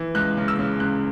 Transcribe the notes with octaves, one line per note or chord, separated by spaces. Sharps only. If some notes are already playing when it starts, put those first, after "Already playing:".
Already playing: E3
C#2 F#6
C#3
E6
C#3
C#2 F#6